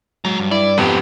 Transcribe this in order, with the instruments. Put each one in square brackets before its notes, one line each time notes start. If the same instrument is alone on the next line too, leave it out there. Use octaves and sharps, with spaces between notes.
[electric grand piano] F#3 [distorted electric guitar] G#3 A#5
[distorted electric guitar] G2
[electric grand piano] E4 [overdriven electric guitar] D5
[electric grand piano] F2 B3 [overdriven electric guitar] G#2 G4